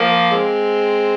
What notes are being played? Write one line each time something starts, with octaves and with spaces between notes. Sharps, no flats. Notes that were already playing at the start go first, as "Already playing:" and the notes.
Already playing: F3 A#3
G#3 C4